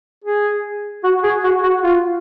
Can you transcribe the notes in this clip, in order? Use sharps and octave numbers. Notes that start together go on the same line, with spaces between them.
G#4
F#4
G#4
F#4
F#4
F4